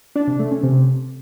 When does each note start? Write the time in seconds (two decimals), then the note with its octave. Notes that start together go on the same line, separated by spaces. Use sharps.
0.15 D4
0.27 C3
0.39 A3
0.51 C#4
0.63 C3